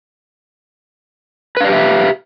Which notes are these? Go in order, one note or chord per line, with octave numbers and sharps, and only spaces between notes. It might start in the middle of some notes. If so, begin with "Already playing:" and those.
G4 B4 D5 E5 F5